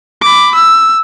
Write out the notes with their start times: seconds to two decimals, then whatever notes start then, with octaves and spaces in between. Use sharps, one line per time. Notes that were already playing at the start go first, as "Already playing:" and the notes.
0.22 B5 D6
0.55 E6